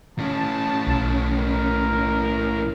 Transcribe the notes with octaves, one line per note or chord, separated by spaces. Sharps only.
A2 C#4 A5
B1
A#4